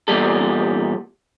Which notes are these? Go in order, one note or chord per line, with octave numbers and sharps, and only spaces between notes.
E2 A#2 G3 A4